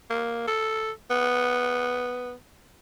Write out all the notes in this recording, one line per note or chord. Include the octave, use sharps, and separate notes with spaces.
A#3
A4
B3